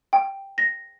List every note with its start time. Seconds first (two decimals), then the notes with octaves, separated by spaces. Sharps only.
0.13 G5
0.58 A#6